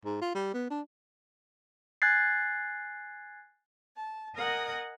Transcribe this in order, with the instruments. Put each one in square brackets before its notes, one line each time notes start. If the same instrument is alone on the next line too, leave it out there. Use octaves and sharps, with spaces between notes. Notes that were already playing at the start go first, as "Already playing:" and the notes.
[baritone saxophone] G#2
F4
G3
B3
D4
[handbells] G#5 F#6 G#6 A6 C7
[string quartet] A5
A#4 D#5 F#5 G#5 D#6